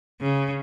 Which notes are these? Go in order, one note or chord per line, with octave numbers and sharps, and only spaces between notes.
C#3